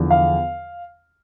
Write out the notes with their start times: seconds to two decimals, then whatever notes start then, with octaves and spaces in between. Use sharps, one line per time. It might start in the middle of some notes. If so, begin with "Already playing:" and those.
Already playing: E2 D3 F3
0.10 F5